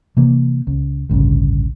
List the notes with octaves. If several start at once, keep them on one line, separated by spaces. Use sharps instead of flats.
C3 E3 A#3
C#2
A1 D2 G2 C#3